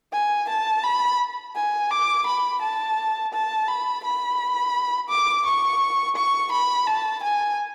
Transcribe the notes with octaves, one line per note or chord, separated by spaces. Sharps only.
G#5
A5
B5
G#5
D6
B5
A5
A5
B5
B5
D6
C#6
C#6
B5
A5
G#5